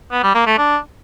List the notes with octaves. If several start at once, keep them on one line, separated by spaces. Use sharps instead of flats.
B3
G3
A#3
A3
D4